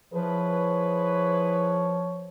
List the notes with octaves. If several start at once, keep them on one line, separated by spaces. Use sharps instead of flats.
F3 E4 G#4 B4 C#5